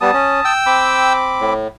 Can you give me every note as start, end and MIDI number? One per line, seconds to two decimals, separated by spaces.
0.01 0.11 55
0.01 0.11 59
0.01 0.52 81
0.01 0.52 87
0.14 0.40 61
0.45 1.13 79
0.45 1.13 88
0.66 1.53 60
0.66 1.53 83
0.66 1.53 86
1.41 1.68 45